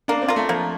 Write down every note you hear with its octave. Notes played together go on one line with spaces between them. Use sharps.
A#3 D4
C4
F4 A#4
A3
F3 A#3